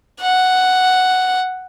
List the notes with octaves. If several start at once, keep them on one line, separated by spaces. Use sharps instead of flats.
F#5